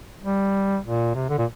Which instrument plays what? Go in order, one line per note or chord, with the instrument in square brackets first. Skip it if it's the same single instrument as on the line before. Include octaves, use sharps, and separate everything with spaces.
[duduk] G3
A#2
C3
D3
A#2